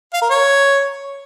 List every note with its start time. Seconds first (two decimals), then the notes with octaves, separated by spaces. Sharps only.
0.14 F5
0.22 A#4
0.30 C#5